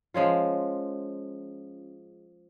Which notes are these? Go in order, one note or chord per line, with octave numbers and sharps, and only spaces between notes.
F3 G#3 C#4 F4